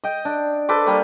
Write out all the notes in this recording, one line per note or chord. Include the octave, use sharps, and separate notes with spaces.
D#5 G5
D4
A4 B4 C5 D6
G3 A#3 B4 C#6